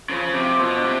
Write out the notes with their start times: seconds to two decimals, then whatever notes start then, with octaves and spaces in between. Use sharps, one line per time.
0.10 C#3 F3
0.26 F3
0.35 C3
0.43 F4
0.59 B2 F3
0.77 D4
0.84 C3